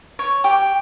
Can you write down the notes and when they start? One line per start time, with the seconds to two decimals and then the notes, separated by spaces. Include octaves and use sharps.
0.19 C#5
0.44 G4